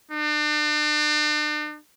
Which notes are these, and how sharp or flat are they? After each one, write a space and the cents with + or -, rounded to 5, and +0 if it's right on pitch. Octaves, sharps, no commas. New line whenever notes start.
D4 +40